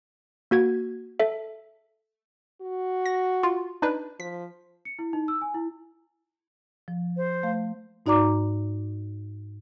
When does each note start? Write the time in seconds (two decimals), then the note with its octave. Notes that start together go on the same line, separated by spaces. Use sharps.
0.51 A#3 F#4 G#6
1.20 A4 E5
2.62 F#4
3.06 A#6
3.43 F4
3.82 D4 D#4 B4
4.20 F3 B6
4.85 C#7
4.99 E4
5.13 D#4
5.28 E6
5.42 G#5
5.54 E4
6.88 F3
7.17 C5
7.43 A3 F5
8.06 G#2 D#4 F#4 D5 A#5 D6